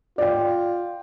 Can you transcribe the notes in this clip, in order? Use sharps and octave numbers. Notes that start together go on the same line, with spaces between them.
F4 D5 G5